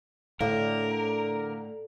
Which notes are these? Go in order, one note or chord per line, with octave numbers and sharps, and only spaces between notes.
A2 D3 A4 A#4 F5